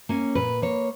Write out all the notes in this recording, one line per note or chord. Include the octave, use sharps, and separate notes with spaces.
A#3 C#4
A#2 B4
A#3 C#5